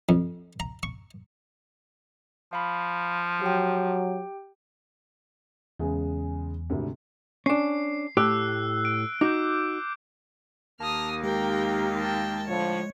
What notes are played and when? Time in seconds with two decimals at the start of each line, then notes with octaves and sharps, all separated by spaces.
0.09 F2
0.60 A#5
0.83 C#6
2.53 F3 F5 B5
3.41 F#3 G4 G5
5.80 E2 C#3 G#3
6.70 G#1 D2 C3
7.46 C#4 D4 C7
8.17 A2 G4 E6 F#6
8.85 D7
9.21 D#4 F#4 D6 G6
10.80 D#2 A#3 A5 D#6 F6
11.23 G#3 G4 A#4 G5
11.98 G5 A5
12.48 A2 D3 F3 C#5